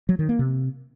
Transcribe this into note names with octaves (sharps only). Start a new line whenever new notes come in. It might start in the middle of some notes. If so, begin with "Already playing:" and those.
F#3
D#3
A#3
C3